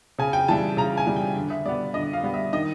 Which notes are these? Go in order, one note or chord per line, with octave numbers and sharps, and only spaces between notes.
C#3 G#5
G5
E3 G3 A5
C#3 A#5
G#5
E3 G3
G5
D3
E5
G3 B3 D5
D3 D#5
F5
G3 B3
E5
D#3 D#5